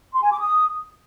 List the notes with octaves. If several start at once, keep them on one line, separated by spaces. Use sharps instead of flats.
C6
G#5
D6
D#6